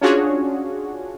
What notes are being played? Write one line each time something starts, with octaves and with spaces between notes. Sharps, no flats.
C#4 D4 F4 F#4 G#4 C#5